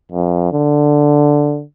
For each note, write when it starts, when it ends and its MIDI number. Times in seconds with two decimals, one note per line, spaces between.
0.12 0.48 41
0.52 1.62 50